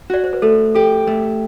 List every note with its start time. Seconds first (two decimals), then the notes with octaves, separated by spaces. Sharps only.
0.10 F#4 D5
0.24 C5
0.33 B4
0.42 A3 A4
0.75 G4 A4
1.07 A3